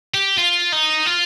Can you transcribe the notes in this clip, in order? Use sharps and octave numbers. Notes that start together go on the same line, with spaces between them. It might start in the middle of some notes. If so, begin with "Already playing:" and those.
G4
F4
D#4
F4